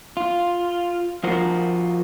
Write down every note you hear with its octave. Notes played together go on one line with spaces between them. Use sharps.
F4
F3 F4 F#4 A#4 C5